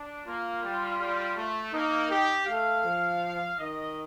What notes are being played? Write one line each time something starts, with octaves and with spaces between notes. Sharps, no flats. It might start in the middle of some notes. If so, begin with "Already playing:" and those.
Already playing: D4
A#3 F4
G3
G3
A3
A#3 D#4
G4
A3 F5
F3
D#3 D#5